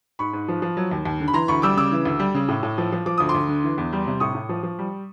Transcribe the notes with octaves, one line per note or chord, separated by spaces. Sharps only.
G#2 B5 C#6
G#2
F3
F3
F#3
D#2
D#2
D3
B5
E3 A#5 C6
D2 B5 C#6
G3 D6 E6
C#3 D6 E6
E3
D2
G3
C#3
A2
A2
F3
F3
F3 D6
D2 D#6
C6 D6
D2
D3
E3
E2
G3
C3
A2 C#6 D#6
A2
F3
F3
G3